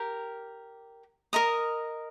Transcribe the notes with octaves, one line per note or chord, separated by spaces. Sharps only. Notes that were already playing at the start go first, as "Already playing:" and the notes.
Already playing: G4 A#4
A#4 D#5 A#5 D#6